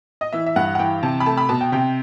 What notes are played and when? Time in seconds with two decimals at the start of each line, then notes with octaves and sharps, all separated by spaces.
0.21 D#5
0.32 E3 E5
0.46 E5
0.56 G2 F#5
0.75 F#5
0.79 E3 G5
1.03 C3 A5
1.20 B5
1.26 A3 A5
1.37 B5
1.49 B2 A5
1.61 G5
1.72 C3 G5